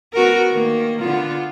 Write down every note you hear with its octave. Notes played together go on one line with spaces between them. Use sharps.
B3 F#4 A#4
D#3 A#3
D3 B3 F4